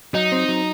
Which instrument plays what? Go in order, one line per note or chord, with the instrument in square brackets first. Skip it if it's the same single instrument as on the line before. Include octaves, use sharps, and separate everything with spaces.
[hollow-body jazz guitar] F#3 [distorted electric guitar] D#4
[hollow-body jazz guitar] C4
F#3